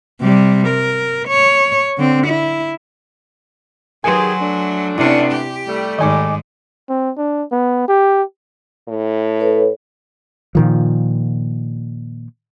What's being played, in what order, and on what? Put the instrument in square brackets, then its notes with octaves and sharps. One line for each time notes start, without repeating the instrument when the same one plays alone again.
[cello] C3 G3
A#4
C#5
D3 C4
E4
[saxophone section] D#3 G4 G#4 [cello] F#3 [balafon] A#4 B4 [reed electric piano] G#5 C6
[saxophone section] A3 D4
[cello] C3 C#4 [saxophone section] A3 B3 D4 [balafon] E4 D5
[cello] G4
[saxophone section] G3 A3
[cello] G#2 [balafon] D#3 D#4 [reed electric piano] D#5 G#5 D6
[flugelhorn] C4
D4
B3
G4
[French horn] A2
[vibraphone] A4 B4 C#5
[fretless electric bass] A#2 D#3 F3